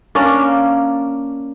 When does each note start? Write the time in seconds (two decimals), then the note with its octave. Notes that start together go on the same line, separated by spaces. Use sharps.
0.15 A#3 C#4 D4 D5